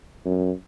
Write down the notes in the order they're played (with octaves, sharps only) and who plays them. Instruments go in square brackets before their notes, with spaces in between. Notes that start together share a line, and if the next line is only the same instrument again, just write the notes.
[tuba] F#2